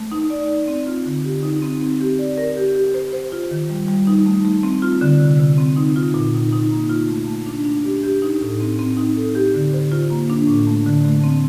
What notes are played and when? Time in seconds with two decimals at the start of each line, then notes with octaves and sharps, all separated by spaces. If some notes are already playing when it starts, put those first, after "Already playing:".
Already playing: A3
0.12 D#4
0.30 D5
0.48 D5
0.68 C4
0.87 F4
1.06 D3
1.24 G4
1.43 D#4
1.62 C4
1.81 C4
2.00 G4
2.19 D5
2.38 A#4
2.57 G4
2.75 G4
2.94 C5
3.13 C5
3.32 F4
3.51 D#3
3.70 G3
3.88 G3
4.07 D#4
4.26 A3
4.45 A3
4.63 C4
4.82 F4
5.01 D3
5.20 C3
5.39 C3
5.58 C4
5.76 D#4
5.96 F4
6.14 A#2
6.34 D#4
6.52 D#4
6.71 A#3
6.89 F4
7.09 A3
7.27 A3
7.46 D4
7.65 D4
7.84 G4
8.03 G4
8.22 D#4
8.41 A2
8.60 C4
8.79 C4
8.97 D#4
9.16 A4
9.35 G4
9.54 D3
9.73 C5
9.92 F4
10.10 A#3
10.30 D4
10.48 A2
10.67 A3
10.86 D3
11.05 A3
11.24 C4